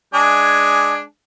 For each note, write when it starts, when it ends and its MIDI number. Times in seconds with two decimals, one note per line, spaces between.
0.14 1.02 56
0.14 1.02 62
0.14 1.02 80